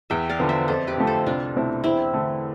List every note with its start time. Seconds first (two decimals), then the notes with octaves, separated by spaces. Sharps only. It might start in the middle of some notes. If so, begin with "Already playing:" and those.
0.10 E2 E5 G5
0.29 D5 F5
0.39 D3 F3 B3
0.49 C5 E5
0.68 F2 A4 C5
0.87 G4 B4
0.97 D3 F3 A3
1.07 A4 C5
1.26 C2 D4 F4
1.55 B2 A3 C4 E4
1.84 E2 C4 E4
2.13 D3 A3